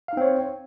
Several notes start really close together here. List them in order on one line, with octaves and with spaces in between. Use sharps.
F5 D#4 C4 C#5